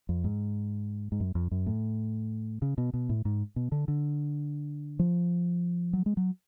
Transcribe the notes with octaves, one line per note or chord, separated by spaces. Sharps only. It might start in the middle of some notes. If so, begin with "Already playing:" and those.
F2
G#2
G#2
F#2
F2
F#2
A2
C#3
B2
B2
A2
G#2
B2
D3
D3
F3
F#3
G#3
F#3